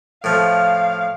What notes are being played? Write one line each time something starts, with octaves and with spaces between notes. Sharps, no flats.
A2 F3 F5